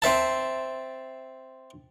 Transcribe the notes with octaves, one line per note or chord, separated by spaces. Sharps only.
C4 C5 E5 A5